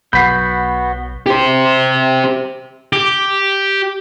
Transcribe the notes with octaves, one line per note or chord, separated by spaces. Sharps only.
B1 F#3 B3 F#4 B5 G6 B6 C7
G4 C5
G4